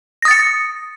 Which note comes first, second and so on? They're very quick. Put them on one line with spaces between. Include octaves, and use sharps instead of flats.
A#6 D#6 A6 C#7